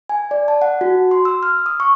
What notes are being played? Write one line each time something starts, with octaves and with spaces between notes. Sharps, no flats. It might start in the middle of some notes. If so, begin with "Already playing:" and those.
G#5
D5
A5
F#5
F#4
C6
E6
F6
D#6
C#6